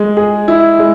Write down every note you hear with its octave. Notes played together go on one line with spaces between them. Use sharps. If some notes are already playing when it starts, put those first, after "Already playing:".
Already playing: G#3
G#4
E4
G#3